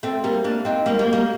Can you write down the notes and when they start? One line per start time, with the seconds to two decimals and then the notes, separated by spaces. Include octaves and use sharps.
0.03 A3 C4
0.24 G3 A#3
0.44 A#3 D4
0.65 C4 D#4
0.86 G3 A#3
0.99 G3 A#3
1.13 G3 A#3